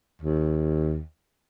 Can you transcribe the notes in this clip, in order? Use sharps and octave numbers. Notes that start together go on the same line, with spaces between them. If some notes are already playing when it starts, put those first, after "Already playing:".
D#2